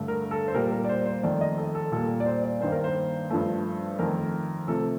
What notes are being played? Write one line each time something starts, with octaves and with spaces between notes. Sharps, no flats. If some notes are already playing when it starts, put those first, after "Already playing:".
Already playing: G2 D3 A3
A#4
A4
C5
A#2 G3 A#3 A#4
A#4
D5
C5
C5
F2 D#3 A3 D5
D#5
A4
A4
A#2 G3 A#3 A4
D5
C5
D5
G2 D#3 A#3 C5
A#4
C5
G2 F3 A3
F2 D#3 A3 A#4
C3 F3 A3 A4